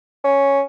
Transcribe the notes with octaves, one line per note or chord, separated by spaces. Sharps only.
C#4